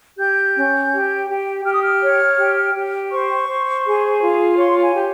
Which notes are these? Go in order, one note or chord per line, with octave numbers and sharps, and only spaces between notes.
G4 G6
C#4
G4
G4
G4 F6
D#6
F6
C#5
G4
G4
C5 C#6
C5
G#4
F4
C#5 C6
G#5
G4